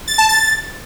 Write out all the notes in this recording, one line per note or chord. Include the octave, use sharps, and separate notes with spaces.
A6
A5
A6